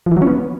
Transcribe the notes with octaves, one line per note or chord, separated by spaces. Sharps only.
F3
E3
F#3
C#4
B3